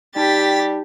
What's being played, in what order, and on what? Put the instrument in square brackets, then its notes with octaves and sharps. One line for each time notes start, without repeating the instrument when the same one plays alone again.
[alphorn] G3 [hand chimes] D#4 A5 [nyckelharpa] G4 [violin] A6 B6